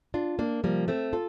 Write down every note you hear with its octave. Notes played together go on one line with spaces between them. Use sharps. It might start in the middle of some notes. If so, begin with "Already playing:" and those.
D4 F4
A#3 D4
C3 F3 G3 A#3
A3 C4
F4 A4